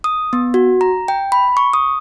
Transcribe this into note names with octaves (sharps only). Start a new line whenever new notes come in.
D#6
B3
F#4
A#5
G5
B5
C#6
D#6